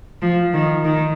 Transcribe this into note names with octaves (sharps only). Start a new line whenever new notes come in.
F3
D#3
D#3